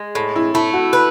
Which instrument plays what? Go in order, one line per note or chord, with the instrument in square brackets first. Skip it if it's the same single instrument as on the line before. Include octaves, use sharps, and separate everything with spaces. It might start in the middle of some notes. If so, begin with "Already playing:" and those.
Already playing: [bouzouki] G#3
A2
[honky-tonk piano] E4
[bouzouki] A3 [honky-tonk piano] E4
[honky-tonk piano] F#4
[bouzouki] B4